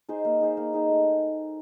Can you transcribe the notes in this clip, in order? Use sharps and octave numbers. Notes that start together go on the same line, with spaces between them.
D#4 G#4 C5
A#3
D#4 G#4 C5
A#3
D#4 G#4 C5
A3